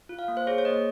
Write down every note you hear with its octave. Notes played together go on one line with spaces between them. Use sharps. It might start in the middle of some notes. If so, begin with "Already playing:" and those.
F4
F5
A#3
C5
G#4 C#5
C#5
A#3 D#5